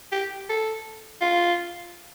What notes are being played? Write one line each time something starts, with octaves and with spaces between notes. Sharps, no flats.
G4
A4
F4